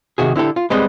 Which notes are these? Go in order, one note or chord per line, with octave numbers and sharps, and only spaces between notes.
C3 D#3 F#4 G#4
D3 E4 G4 A4
F4
G3 G#3 B3 C4 D#5